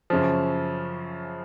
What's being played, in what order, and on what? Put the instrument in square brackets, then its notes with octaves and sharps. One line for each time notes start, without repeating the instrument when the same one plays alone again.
[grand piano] F#2 C#3 F3